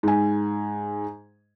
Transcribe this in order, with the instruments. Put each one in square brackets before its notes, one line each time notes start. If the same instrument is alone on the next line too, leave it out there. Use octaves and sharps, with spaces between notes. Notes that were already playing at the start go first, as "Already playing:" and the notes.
[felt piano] G#2 G#5